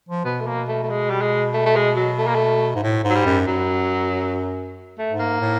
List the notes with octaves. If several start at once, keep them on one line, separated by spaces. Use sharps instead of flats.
F3
B2 B3
A3
A#3
A3
A3
G#3
G3
G#3
A3
A3
G#3
F#3
A3
A#3
A3
G#2
A2
G#2
F#3
G3
F#2
F#2 F#3
A3
G#2
A#3
A2